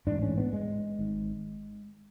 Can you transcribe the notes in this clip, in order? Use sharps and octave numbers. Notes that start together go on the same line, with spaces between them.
A1 G#2 D4
C#4
B3
G#3
G#1 G#2